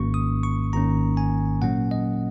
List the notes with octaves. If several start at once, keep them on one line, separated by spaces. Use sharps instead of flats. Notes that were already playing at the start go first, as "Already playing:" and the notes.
Already playing: G#1 G#2 D#3 A#3 C#4 C#6
D#6
C#6
G#1 G#2 D#3 A#3 C#4 A#5
G#5
A#2 F#3 A#3 C#4 F#5
D#5